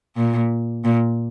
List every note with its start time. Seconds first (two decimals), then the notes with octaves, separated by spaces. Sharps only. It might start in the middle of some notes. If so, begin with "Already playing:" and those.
0.17 A#2
0.85 A#2